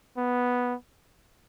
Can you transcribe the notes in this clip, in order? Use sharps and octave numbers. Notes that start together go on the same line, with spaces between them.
B3